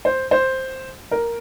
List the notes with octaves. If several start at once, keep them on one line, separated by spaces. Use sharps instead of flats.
C5
C5
A#4